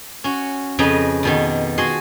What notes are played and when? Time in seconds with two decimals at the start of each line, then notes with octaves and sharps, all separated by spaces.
0.24 C#4 F#4
0.79 F2 C#3 B4 D#5 A#5
1.23 F2 B2 D#3
1.78 F#4 G#4 A5 C6